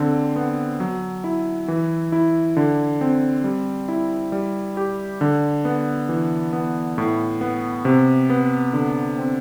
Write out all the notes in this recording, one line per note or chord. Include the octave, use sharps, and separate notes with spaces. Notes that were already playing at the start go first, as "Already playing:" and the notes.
Already playing: D3 C4
B3
F#3
E4
E3
E4
D3
C4
G3
E4
G3
G4
D3
B3
E3
B3
A2
B3
C3
B3
D3
C4